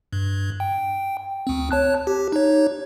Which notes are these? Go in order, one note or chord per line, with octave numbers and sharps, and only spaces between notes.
G2
G5
D2 C4
C#5 A5 F#6
G4
D#4 C#5